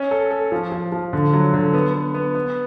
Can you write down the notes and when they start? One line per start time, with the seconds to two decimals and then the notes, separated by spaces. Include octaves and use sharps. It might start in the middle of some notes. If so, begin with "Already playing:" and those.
Already playing: C#4
0.11 A4
0.31 A4
0.52 F3
0.72 F3
0.92 F3
1.13 D3
1.33 F#3
1.54 D3
1.74 B3
1.94 B3
2.14 B3
2.35 B3